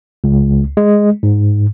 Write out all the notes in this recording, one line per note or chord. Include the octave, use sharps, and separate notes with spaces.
C#2
G#3
G#2